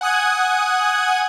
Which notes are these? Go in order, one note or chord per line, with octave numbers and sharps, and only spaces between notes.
F#5 G#5 D#6 F#6 G#6